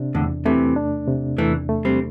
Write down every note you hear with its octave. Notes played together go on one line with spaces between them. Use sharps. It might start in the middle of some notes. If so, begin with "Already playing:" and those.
Already playing: C3 D4
E2 A2 D3
C3 E3 A3
D4
C3
E2 E3 A3
A3
G3 C4